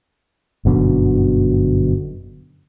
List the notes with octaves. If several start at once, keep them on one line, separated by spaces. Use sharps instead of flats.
G1 F#2 B2 D3